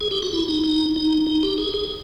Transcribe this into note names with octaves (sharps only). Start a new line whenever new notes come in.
G#4
G4
F#4
E4
D#4
D#4
D#4
D#4
G4
G#4
G#4